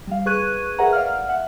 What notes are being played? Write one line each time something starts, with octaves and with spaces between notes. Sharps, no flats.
G3 F5
G#4 B4 C#6 F#6 G#6 D#7
G#4 A#4 B4 E5 F#5 A#5
D5 F5 F#5 F6
E5 F#5